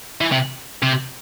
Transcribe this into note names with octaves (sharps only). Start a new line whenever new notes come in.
E3
C3
C3